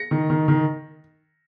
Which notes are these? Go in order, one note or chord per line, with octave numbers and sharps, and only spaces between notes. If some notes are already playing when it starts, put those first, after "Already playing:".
Already playing: A#6 C#7
D#3
D#3
D#3